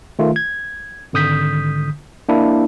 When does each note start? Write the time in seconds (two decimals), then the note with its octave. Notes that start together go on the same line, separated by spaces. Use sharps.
0.19 D#3 A3 F4
0.36 G#6
1.13 G#1 D3 D#6 G6 B6
2.29 A#3 D4 E4